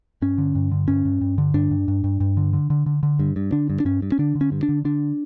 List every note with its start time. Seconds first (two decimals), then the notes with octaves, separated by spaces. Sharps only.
0.22 G2 C#4
0.38 D3
0.55 G2
0.71 D3
0.88 G2 C#4
1.05 G2
1.21 G2
1.38 D3
1.54 G2 D4
1.71 G2
1.88 G2
2.04 G2
2.20 G2
2.37 D3
2.53 D3
2.70 D3
2.86 D3
3.03 D3
3.19 G2
3.36 G2
3.52 D3 D4
3.70 G2
3.80 D4
3.85 G2 C#4
4.02 G2
4.12 C#4
4.19 D3 D4
4.35 D3
4.41 C#4
4.52 G2
4.63 D4
4.69 D3
4.85 D3 D4